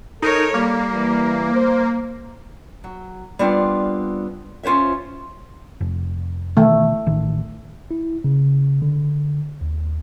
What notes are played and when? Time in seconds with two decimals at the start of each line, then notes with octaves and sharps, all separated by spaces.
0.22 D#4 A4 A#4 C#5
0.54 G3 A#3
0.93 E3
1.54 C5
2.84 F#3
3.39 G3 B3 C4 D4 F4
4.63 C#4 F4 C5 C#5 E5
5.81 F1
6.57 B2 D#3 E3 A3
7.06 A1 D#3
7.91 E4
8.24 C#3
8.82 D3
9.61 D#2